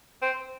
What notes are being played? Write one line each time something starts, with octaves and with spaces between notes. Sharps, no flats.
C4